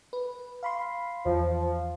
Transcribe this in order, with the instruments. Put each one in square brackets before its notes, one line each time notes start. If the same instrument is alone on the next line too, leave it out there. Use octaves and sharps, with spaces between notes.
[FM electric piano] B4
F5 B5 C6
[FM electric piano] E2 [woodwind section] F3